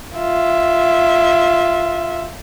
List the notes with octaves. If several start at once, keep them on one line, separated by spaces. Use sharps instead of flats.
F4 E5